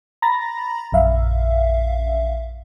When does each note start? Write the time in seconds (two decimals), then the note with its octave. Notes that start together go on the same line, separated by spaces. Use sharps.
0.22 A#5 B5 A6 A#6
0.92 A#1 F#2 E5 F5